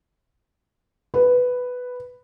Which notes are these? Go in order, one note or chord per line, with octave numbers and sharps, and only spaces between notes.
B4